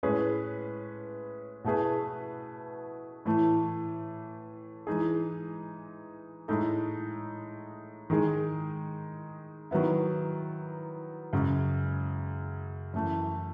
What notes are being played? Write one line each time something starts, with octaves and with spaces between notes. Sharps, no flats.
A2 G#3 C#4 G#4 B4
B2 A3 E4 G#4 B4
A2 E3 A3
E3 G#3 D#4 G#4
A2 G#3 D#4 A4
D#3 G#3 D#4 G#4
D#3 F#3 B3 E4
F#2 C#3 G#3
F#2 E3 A3